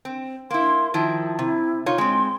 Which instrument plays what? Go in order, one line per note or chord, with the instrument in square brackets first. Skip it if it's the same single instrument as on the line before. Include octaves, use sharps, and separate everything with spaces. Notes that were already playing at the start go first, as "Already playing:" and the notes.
[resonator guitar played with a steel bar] C4
[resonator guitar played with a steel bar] A#3 E4 [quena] C6
[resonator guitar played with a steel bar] D#3 F3 E4 [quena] A5
[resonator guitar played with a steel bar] C3 [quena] E4
[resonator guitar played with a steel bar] D#4 F4 C#5
[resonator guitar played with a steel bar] G#3 C4 [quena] C6